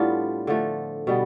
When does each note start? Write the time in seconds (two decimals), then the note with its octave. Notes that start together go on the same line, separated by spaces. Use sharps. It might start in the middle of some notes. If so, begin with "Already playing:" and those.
Already playing: A2 G3 B3 D4 F4
0.47 D3 F3 A3
1.07 B2 G3 B3